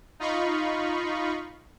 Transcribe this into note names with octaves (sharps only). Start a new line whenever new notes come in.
D#4 F4 D#5 F5 B5 C#6